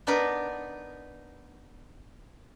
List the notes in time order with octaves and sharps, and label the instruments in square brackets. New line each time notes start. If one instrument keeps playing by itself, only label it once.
[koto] B3 D4 D#4 A#4 B4